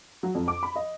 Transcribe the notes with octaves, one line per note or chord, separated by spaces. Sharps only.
F#3
F2
D6
B5
D#5